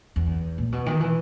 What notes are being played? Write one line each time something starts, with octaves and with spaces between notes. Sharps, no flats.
E2
A#2
B2
D#3
E3